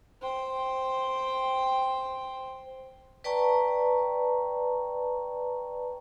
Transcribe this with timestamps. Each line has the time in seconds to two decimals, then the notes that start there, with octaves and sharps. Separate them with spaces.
0.21 C5 G5
3.24 B4 D5 G5 A5 A#5 C#6